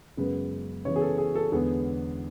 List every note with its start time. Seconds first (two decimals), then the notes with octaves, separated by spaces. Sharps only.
0.17 F#2 C#3 G#3 B3 B4
0.85 C#3 E3 B3 C#5
0.96 G#4
1.01 A4
1.18 G#4
1.35 A4
1.52 E2 D3 G#3 B3 G#4